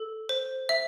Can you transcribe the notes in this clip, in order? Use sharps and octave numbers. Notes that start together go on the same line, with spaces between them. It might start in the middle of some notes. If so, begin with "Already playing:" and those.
Already playing: A4
C5
E5